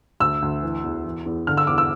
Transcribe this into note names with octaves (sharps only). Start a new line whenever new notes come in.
D2 E6
D2
E3
E2
E3
E2
D3 F6
E6
E2 D6
E6